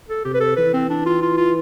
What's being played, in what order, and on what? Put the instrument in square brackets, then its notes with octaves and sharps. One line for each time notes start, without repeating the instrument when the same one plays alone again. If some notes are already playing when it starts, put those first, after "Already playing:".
[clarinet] A4
[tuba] C3 [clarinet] G4
[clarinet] B4
A4
[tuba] E3 [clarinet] B4
[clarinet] C4
D4
F4
F4
F4